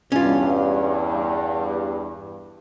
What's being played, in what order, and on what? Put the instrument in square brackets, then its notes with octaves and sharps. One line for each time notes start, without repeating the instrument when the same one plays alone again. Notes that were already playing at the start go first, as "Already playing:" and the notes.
[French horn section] E2 G2 [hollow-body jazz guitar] C#4 F4